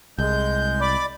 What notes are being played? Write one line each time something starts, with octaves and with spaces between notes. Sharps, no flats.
C2 G#3 G6
D5 B5 D6